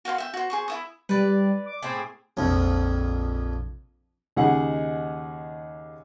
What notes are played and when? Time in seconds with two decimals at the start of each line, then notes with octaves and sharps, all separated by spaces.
0.05 F#4 F5 G5 C6
0.18 E5 G5
0.33 F#4 C5
0.50 G#4 C5 C#6
0.68 E4 E5 D#6
1.09 G3 B4 D5
1.66 D6
1.83 A2 C4 G#4
2.37 A#1 F2
4.36 D#2 C#3 D#4 G#4 F#5